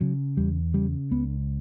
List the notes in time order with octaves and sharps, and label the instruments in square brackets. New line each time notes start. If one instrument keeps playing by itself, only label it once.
[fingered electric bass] C#3 F#3
E2 G3
C#3 G3
C#2 B3